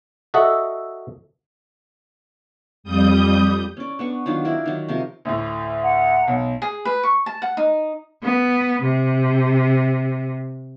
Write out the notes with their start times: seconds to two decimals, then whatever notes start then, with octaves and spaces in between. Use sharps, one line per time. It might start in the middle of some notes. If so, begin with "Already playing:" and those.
0.34 F#4 A4 D#5 E5 F#5
2.84 F2 G3 D#6 G6
3.77 C#4 D5
3.99 B3 D4 C#6
4.26 D#3 F#3 D4 F4
4.45 D4 E4 A#4 D5
4.66 D#3 F#3
4.88 C3 F3 A#4
5.25 D2 A2
5.83 F#5 A#5
6.28 B1
6.62 G#4
6.85 B4
7.03 C#6
7.26 A5
7.42 F#5
7.57 D#4
8.22 B3
8.82 C3